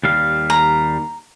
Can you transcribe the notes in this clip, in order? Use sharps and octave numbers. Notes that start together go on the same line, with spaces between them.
D#2 G3 F5
A#5